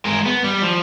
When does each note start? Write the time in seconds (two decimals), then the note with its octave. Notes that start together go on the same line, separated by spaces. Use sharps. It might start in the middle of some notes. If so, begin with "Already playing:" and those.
0.05 G#3 A#4
0.25 B3
0.44 G3
0.62 F3